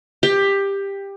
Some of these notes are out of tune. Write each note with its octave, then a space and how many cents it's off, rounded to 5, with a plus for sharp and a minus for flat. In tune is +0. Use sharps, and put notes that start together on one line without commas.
G4 +15